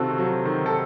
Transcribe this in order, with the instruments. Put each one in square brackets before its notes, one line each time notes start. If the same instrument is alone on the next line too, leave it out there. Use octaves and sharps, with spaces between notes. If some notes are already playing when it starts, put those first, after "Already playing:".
Already playing: [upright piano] C3 D#3 C4 [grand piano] F4 F#4 A4
[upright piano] F#3
D#3
[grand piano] A4